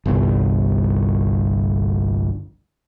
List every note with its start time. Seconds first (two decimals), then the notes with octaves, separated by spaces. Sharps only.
0.06 G1 C2